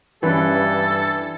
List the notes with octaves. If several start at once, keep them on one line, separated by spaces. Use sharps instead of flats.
G2 E3 C#4 A4 B4